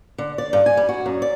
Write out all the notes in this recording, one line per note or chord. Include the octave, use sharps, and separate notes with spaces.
D3
D5
G2
G#5
G3
F#4
F#2
D5